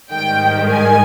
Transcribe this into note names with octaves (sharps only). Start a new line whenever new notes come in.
G#2 D#3 G3 G5
G#5